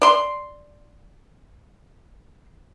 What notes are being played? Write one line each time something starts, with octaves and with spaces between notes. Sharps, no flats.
D5 C6